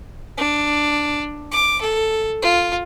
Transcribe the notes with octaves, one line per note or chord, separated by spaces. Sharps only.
D4
D6
A4
F4